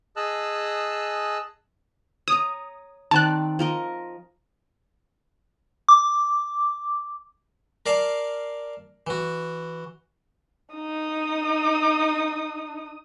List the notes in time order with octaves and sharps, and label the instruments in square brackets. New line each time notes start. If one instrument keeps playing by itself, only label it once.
[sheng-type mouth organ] G#4 D#5 A5 E6 F#6
[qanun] C#5 A#5 [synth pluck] D#6
[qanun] D#3 C4 D5 [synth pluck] A5 F#6
[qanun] F3 A#4 D#5
[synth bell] D6
[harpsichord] A#4 D5 F5 A5
E3 F#4
[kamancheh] D#4 D#6